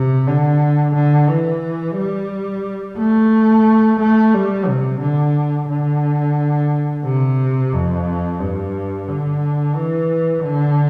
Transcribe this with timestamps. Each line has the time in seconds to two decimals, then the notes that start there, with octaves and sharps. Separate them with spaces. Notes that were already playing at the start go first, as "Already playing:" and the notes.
Already playing: C3
0.27 D3
0.95 D3
1.29 E3
1.97 G3
2.98 A3
4.00 A3
4.34 G3
4.68 C3
5.01 D3
5.70 D3
7.05 C3
7.73 F2
8.40 G2
9.07 D3
9.76 E3
10.43 D3